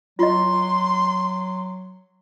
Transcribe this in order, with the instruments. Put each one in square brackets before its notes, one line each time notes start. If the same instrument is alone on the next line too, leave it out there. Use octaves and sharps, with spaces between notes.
[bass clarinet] F#3 [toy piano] F4 D#5 [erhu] C6